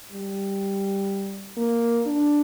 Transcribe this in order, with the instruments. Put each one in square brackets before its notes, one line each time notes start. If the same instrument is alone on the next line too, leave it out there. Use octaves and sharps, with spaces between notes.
[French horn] G3
A#3
D4